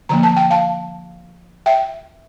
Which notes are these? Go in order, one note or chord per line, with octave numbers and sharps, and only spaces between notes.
D3 F3 A#3 A#5
A5
G5
F5 A5
E5 G5